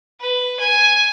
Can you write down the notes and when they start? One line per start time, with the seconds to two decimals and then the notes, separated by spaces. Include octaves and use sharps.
0.20 B4
0.60 G#5